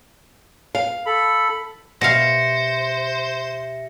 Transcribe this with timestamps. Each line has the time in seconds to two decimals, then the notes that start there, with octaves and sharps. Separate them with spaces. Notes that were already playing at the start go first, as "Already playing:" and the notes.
0.75 F5
1.06 A4 B5
2.01 B2 G4 C5 E5 F5 A#6 C#7